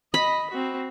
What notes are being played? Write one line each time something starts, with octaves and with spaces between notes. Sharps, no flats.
D#5 B5
C4 F#4